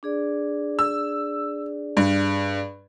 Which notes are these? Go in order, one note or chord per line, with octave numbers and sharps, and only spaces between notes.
D4 G#4 D5
E6
G2